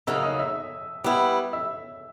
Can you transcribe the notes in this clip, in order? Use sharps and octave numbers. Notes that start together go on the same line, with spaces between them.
C#3 F#3 A#3 D#4 E5 E6
D#5 D#6
D#6
E5 E6
G3 B3 E4
E5 E6